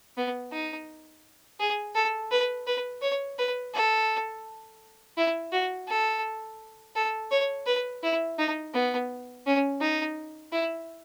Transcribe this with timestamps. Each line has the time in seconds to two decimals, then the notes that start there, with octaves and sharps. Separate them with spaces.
0.17 B3
0.53 D#4
1.60 G#4
1.95 A4
2.31 B4
2.67 B4
3.02 C#5
3.38 B4
3.74 A4
5.18 E4
5.52 F#4
5.88 A4
6.96 A4
7.31 C#5
7.67 B4
8.03 E4
8.39 D#4
8.74 B3
9.46 C#4
9.81 D#4
10.53 E4